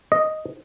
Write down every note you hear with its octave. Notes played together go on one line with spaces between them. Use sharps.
D#5